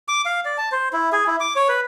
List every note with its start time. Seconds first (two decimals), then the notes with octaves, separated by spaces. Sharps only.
0.08 D6
0.26 F5
0.45 D5
0.58 A5
0.72 C5
0.93 E4
1.12 G#4
1.27 E4
1.40 D6
1.56 C#5
1.69 B4